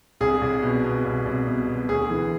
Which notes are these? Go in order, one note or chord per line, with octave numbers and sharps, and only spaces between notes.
C2 G#4
C2
B2
B2
C2
C2
B2
B2
D2 G#4
E3